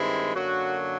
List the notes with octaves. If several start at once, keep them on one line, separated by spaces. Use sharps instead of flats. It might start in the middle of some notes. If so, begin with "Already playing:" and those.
Already playing: G2 D#3 G#3 C4 E4
F#2 D3 F#3 A#3 F#4